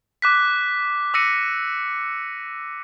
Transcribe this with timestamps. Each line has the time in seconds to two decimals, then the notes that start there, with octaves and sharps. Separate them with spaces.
0.22 D6 F#6 B6
1.14 D6 E6 A#6 C#7 D#7